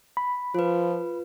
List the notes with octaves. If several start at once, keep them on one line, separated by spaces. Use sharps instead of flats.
B5
F3 F4 B4